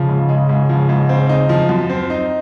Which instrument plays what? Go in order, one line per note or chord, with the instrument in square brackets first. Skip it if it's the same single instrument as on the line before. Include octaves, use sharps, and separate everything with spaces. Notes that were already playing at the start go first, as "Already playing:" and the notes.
Already playing: [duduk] C#3 [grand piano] F3
[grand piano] G#2
G#3
G#2
F3
G#2
C4
D#4
F3
F#2
C4
D#4